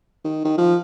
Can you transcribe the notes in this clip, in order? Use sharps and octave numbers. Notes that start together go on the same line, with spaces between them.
D#3
D#3
F3